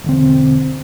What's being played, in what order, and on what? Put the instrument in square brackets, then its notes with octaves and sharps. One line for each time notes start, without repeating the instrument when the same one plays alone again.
[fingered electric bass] E1 D3 C4